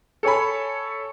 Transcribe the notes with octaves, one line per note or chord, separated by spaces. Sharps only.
A4 C#5 G#5 B5